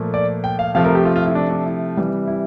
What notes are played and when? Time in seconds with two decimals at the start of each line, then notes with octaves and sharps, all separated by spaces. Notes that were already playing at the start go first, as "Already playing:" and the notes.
Already playing: A#2 F3 A3
0.14 D5
0.44 G5
0.59 F5
0.75 C3 F3 A3 F5
0.85 A#4
0.95 G4
1.05 F4
1.16 F4
1.26 E4
1.35 D4
1.51 D4
1.66 E4
1.97 C3 E3 G3
2.27 E4